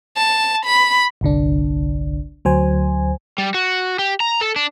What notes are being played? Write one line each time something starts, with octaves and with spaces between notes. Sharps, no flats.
A5
B5
G1 C2 D3 D4
D2 F#3 C5 G#5
G3
F#4
G4
A#5
A4
D4